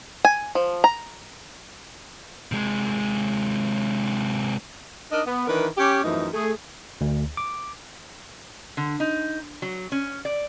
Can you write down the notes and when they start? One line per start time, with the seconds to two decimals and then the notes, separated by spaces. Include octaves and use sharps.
0.25 G#5
0.55 F3
0.84 A#5
2.52 C3 G#3
5.12 D4 D#4 A#4 D#5
5.27 B3
5.48 D#3 E3 D4 A#4 B4
5.77 C#4 G4
6.04 F#2 E3 F3 A3 D#4
6.34 A3 G#4
7.01 D2
7.37 D6
8.77 D3
9.00 D#4
9.62 F#3
9.92 C#4
10.25 D5